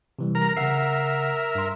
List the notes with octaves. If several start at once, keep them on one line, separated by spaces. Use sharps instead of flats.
C3 E3 G3
A#4 A#5
C#3 A#4 E5 F#5 C7
G2 C6